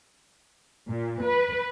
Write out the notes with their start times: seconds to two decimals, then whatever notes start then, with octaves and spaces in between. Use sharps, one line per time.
0.89 A#2
1.23 B4